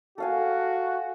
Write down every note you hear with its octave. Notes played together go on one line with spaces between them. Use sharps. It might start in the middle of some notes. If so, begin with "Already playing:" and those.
F#4 A4 F5 G#5